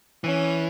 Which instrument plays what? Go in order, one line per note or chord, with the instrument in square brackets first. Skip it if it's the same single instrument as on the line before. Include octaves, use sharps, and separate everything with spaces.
[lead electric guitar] E3 [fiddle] C#4